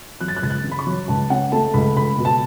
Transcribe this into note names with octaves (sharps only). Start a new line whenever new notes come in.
F#3 F#6
A6
F#6
C#2 A6
F#6
C#3
B5
C#6
F#3
C#2 A5
C#4 F#5
A3 A5
C#2 B5
C#2 B5
B2
A5